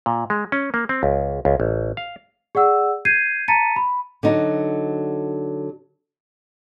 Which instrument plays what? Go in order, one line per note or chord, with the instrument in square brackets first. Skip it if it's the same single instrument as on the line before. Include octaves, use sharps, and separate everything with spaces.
[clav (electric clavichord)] A#2
G#3
C#4
A#3
C4
C#2
C#2
A1
F5
[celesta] G#4 D5 F#5 E6
G6 G#6 C7 D#7
A5 A#5 A6 B6 C#7 D#7
B5
[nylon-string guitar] D3 F#3 D#4